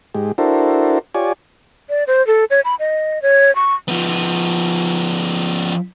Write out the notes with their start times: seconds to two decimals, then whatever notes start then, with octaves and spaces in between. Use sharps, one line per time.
0.15 G#2 G#3 G4
0.38 D4 E4 F#4 A4 A#4 C5
1.15 F4 G4 C#5 D5 G#5
1.90 D5
2.07 C5
2.27 A4
2.50 C#5
2.65 B5
2.80 D#5
3.22 C#5
3.56 C#6
3.88 F3 B3